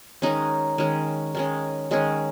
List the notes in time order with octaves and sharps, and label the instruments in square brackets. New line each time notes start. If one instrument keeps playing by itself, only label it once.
[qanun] D#3 G#3 C#4 D#4
D#3 G#3 C#4
D#3 G#3 C#4
D#3 G#3 C#4